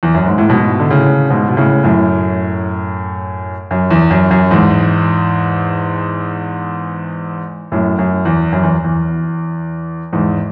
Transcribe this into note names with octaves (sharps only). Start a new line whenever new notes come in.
E2
F#2
G#2
A2
G#2 B2
D3
A2 C#3
G#2 B2
B2
A2 C#3
F#2 A2
F#2
E2
F#2
F#2
E2 G#2
F#2 A2
F#2
E2
F#2
E2
E2
E2 G#2